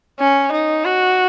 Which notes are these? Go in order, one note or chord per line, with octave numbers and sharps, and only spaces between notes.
C#4
D#4
F#4